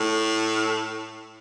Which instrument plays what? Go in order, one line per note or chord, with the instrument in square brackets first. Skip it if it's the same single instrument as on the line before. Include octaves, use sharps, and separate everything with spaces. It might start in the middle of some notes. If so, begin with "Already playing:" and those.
Already playing: [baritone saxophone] A2